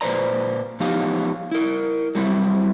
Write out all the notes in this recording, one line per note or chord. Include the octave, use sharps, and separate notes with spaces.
A#2 B4 C5 D5 A#5
F3 B3 D#4 G4 F5
E4 A#4
F#3 G3 C4 E4